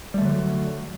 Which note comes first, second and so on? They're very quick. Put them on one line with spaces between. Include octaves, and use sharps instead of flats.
G3 A3 D3 F#3